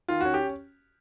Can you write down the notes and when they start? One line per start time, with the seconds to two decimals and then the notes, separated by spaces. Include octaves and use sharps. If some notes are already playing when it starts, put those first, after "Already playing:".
0.08 D#3 F4
0.21 C#4 F#4
0.34 G4